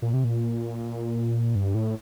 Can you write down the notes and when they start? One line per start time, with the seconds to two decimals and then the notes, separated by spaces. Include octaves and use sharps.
0.02 A#2
0.13 C3
0.24 A#2
1.55 G2
1.75 A2